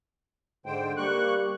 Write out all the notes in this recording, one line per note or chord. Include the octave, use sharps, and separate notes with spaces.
G#2 D3 C5 G5
G3 A#3 C#6 F#6